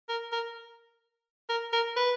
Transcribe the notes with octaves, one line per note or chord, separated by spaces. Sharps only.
A#4
A#4
A#4
A#4
B4